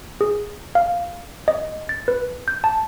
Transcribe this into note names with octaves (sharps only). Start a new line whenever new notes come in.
G#4
F5
D#5
A6
B4
G6
A5